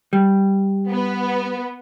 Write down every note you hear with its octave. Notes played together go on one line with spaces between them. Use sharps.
G3
B3